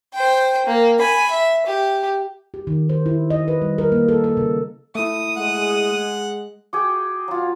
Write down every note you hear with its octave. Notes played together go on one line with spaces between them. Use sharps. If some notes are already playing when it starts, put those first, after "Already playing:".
C5 G5
A#3
G#5 B5
E5
G4
G4
D#3
C5
E4
D#5
B4
G3
A#4
A#3
A4
A4
C#3
A3 E4 D#6
G#3 F#5
F#4 G#4 G5 D6
F#3 F4